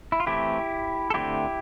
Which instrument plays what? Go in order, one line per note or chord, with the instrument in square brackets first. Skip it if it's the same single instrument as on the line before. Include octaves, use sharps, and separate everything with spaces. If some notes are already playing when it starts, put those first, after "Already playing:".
[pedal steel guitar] E4
F4
E3 A3 C4 E4 G4
A4
D3 A3 C4 E4 G4